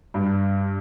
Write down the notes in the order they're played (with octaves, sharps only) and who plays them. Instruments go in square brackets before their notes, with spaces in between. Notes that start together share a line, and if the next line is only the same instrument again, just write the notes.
[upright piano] G2